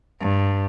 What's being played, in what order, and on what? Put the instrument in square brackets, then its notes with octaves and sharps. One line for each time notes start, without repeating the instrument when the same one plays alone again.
[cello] G2